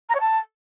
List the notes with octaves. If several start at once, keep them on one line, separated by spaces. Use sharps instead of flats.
A#5
C#5
A5